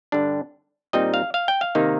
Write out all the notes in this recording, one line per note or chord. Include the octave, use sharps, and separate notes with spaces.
G2 D3 G3 D4
A#2 G3 C4 D#4 D#5
F5
F5
G5
F5
C3 D#3 A#3 D#4